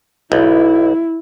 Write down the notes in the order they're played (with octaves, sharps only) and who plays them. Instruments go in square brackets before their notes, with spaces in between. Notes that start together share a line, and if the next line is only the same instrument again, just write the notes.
[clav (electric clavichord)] B1 [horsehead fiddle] E4